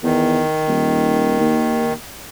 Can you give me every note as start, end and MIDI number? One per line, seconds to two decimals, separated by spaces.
0.03 0.42 40
0.03 1.93 51
0.67 1.36 27
1.40 1.94 39